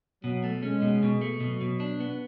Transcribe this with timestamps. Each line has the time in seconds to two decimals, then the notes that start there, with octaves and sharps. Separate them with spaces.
0.24 B2 F#3
0.44 A3
0.63 G#3 C#4
0.82 B2
1.03 B2
1.21 A3
1.40 B2 F#3
1.61 B2
1.80 D4
2.00 B3